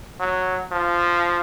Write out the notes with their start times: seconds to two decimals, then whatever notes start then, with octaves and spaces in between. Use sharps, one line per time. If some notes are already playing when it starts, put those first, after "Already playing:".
0.20 F#3
0.72 F3